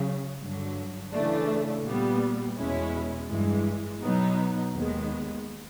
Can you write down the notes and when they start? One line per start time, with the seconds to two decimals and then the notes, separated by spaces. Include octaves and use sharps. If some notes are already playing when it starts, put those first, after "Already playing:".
Already playing: C#3 F#3
0.40 G2 D3 F#3
1.12 C#3 E3 A3 D4
1.84 A#2 G3 B3
2.57 E2 B2 G#3 C#4 E4
3.29 G2 E3 G#3
4.01 B2 F#3 B3 D#4
4.74 D#2 D#3 G#3 B3